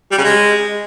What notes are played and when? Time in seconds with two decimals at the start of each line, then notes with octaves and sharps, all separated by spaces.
0.12 G3
0.18 C#3
0.24 G#3